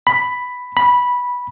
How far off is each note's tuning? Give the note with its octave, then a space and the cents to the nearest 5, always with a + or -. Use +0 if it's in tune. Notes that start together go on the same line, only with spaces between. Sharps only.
B5 +5
B5 -10